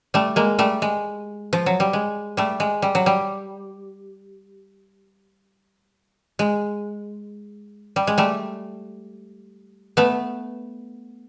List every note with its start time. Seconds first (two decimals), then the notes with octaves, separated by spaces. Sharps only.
0.14 G3 A3
0.36 G#3 A#3
0.59 G3 A3
0.82 G#3
1.53 F3
1.66 F#3
1.80 G3
1.93 G#3
2.37 G3 A3
2.60 G#3
2.82 G3
2.95 F#3
3.06 G3
6.39 G#3
7.96 G3
8.07 G#3
8.18 G3 A3
9.97 A3 B3